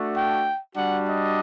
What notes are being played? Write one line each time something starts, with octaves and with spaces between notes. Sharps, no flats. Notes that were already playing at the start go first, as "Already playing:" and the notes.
Already playing: A3 D4 F#4
G5
G3 D4 F#4 F#5
D#5